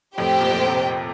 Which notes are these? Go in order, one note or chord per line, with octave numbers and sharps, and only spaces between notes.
F2 A2 G4 C5 G5
A#2
F2 A2
A2 C3